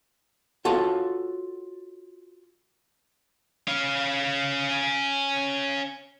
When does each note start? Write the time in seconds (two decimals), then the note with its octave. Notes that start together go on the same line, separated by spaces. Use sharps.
0.65 F4 F#4 A4 C#5
3.68 C#4 F5